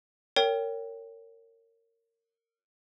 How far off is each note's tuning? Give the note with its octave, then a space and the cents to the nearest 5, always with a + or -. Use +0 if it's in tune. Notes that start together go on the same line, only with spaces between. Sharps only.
A#4 -25 C#5 +10 G5 +0